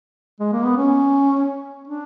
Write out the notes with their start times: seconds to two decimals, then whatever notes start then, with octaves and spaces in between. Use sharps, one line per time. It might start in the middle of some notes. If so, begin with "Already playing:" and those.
0.40 G#3
0.53 A#3
0.64 B3
0.77 C#4
1.88 D4